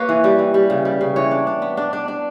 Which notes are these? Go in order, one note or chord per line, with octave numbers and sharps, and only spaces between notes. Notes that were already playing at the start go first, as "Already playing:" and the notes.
Already playing: A#3 B4 C#5
E3
G3
E3
G3
C#3
G3
C#3
E3 C#5
D4
D4
B3
D4
D4
D4